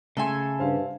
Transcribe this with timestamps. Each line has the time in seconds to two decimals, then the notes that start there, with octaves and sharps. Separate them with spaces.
0.17 C#3 A3 A4 E5 G#5 C6
0.59 G2 C5 F5